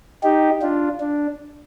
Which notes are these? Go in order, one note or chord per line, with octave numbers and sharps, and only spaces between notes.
D#4 G4
D4 F4
D4